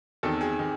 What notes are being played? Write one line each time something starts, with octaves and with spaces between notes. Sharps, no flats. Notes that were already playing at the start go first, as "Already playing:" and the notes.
E2 C3 D#3 A4
G#4
C3 D#3